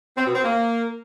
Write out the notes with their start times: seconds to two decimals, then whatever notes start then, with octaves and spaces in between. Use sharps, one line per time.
0.16 C4
0.26 B2
0.35 C4
0.44 A#3